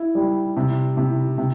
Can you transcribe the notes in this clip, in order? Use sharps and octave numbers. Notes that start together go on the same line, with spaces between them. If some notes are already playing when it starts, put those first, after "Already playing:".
Already playing: E4
G3
C3
C3
C3